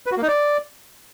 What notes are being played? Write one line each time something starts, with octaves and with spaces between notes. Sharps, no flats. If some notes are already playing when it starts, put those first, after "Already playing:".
B4
F#4
A#3
D#4
D5